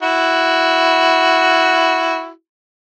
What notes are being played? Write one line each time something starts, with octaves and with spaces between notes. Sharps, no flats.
E4 F#4